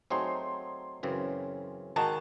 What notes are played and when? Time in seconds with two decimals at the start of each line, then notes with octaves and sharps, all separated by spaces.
0.10 F#3 A3 C4 D#4 G#4 C6
1.03 F#2 C#3 E3 C4
1.96 D#3 G#3 D#4 F#4 A5